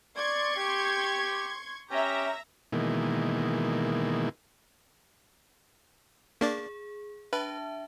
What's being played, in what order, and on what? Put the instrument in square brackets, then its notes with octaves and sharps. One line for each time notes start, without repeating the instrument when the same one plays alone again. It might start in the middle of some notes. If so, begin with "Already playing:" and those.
[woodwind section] D5 [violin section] C6 C#6 G#6
[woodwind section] G4
[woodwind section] C#4 G4 [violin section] E5 A#5
[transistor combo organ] B2 D#3 E3 G#3 A#3
[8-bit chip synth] A#3 D4 D5 [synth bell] G#4
[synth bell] D4 E5 A5 [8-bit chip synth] B4